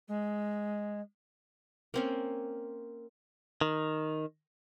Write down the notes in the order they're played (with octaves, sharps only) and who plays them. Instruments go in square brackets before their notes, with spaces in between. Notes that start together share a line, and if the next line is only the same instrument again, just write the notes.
[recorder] G#3
[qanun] A#3 C4 C#4
[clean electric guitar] D#3